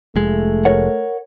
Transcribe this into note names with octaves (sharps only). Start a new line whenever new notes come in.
F1 G#3 A3
A#4 C#5 F#5